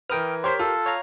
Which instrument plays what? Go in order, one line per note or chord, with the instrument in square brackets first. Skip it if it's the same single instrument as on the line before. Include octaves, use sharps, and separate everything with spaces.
[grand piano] E3 A#4 B4 [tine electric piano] G5 D#6 F6
[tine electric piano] G4 A#4 [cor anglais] C5 [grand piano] C#5 G6 B6
[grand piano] F4 [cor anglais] A4
[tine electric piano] C#5 F5 A#5